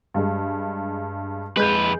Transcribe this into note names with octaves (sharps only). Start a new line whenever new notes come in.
G2 G#3
F2 G#3 B4 G6